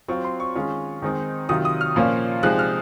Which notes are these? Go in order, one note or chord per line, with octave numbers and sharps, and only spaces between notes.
F#3 C4 F4 C#6
C6
C#6
D#3 G#3 C#4 F4
D#3 G#3 C4 D#4
C3 D#3 F#3 C4 F4 D#6
D#6
F6
A#2 F3 A#3 C#4 F4
C3 F3 G#3 D#4 F#6
F6